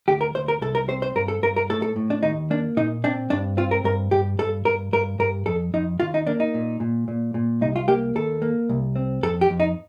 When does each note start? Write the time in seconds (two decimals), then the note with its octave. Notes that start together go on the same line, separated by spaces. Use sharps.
0.08 D2 G4
0.21 A#4
0.35 D2 C5
0.48 A#4
0.61 C2 A4
0.75 A#4
0.89 C4 C5
1.02 C5
1.15 G2 A#4
1.28 A4
1.43 G2 A#4
1.56 A#4
1.70 A2 A4
1.82 A4
1.96 A2
2.10 D4
2.23 D#2 D#4
2.50 A#3 D4
2.77 A#2 D#4
3.04 C4 D4
3.30 G2 D4
3.57 C4 F4
3.71 A#4
3.84 G2 A#4
4.11 G2 G4
4.39 G2 A4
4.65 G2 A#4
4.93 G2 A#4
5.19 G2 A#4
5.46 F2 A4
5.74 F2 D#4
6.00 D#2 F4
6.14 D#4
6.27 A#3 D4
6.40 D#4
6.54 A#2
6.80 A#2
7.08 A#2
7.34 A#2
7.61 C2 D#4
7.76 F4
7.88 A#3 G4
8.15 D#2 A4
8.42 A#3
8.69 C2
8.96 C4
9.23 F2 A4
9.41 G4
9.50 F2
9.60 D#4